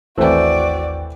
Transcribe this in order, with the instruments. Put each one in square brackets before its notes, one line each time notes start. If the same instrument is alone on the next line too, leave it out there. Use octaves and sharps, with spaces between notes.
[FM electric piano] G#1 D#2 G5 [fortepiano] E3 A3 C4 [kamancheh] F#4 D5